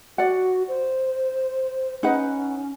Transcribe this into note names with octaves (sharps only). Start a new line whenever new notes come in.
F#4 D5 F#5
C5
C#4 D#4 B4 F#5